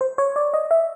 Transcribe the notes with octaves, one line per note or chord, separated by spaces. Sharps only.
C5
C#5
D5
D#5
E5